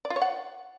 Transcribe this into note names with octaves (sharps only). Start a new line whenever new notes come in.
D5
F4
C#5
F#5